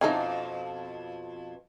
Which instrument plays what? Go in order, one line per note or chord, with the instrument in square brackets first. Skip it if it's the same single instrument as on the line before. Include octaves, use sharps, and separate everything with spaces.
[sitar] F2 B2 [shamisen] C#4 E4 A4 [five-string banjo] D#4 G#5